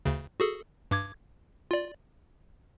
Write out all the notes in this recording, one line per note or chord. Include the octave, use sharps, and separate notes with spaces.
D2 C#3
F#4 G#4 A4
G2 D6 G#6
F4 D5